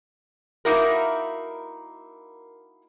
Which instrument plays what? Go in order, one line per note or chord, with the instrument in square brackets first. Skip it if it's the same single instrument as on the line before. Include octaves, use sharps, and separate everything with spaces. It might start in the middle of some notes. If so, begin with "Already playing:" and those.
[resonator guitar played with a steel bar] A#3 D#4 E4 F#4 A#4